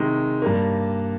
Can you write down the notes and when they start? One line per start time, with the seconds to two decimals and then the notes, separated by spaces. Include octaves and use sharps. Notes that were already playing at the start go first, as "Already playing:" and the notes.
Already playing: C3 D#3 G#3
0.42 G2 G3 A#3